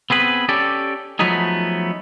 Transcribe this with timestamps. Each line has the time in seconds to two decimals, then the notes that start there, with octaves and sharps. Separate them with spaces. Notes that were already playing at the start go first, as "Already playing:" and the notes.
0.10 B3 C4 G#4 B4
0.49 C#4 G4 A4 D5
1.19 F3 F#3 A3 B3 D#4 G#4